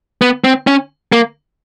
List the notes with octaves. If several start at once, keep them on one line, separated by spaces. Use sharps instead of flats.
B3
C4
C#4
A#3